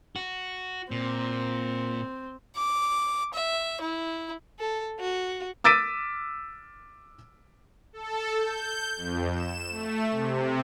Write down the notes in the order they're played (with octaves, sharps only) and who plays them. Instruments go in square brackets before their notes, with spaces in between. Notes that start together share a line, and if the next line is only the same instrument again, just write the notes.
[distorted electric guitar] F#4
[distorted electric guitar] A#2 [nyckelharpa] C4
[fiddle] D6
E5
E4
[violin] A4
F#4
[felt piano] D6 E6 A6 B6 D7 D#7
[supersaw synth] A4
G6
F2
E7
A3
C3